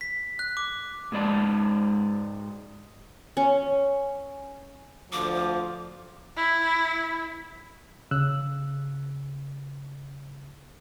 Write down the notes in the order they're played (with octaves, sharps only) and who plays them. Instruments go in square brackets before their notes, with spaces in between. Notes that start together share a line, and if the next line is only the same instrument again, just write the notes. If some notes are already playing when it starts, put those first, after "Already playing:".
[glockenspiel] B6
F#6
D6
[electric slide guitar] G#2 G#3 D5 A5
[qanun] C#4
[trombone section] D2 F3 [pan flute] D6
[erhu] E4
[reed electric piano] C#3 E6 F#6